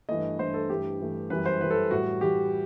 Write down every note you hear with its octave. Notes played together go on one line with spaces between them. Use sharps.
G2 E3 A3 D#5
G2 E3 A3 C5
A4
G2 E3 A3 G4
G2 E3 A3
F#2 E3 G3 B4
C5
F#2 E3 G3 B4
A4
A2 E3 G3 F#4
A2 E3 G3 G4